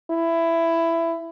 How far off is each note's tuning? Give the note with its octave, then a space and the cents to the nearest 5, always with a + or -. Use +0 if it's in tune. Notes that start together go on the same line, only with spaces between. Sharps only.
E4 +15